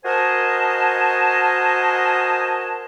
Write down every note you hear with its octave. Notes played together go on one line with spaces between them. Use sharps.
F#4 A#4 C5 D#5 G#5 A5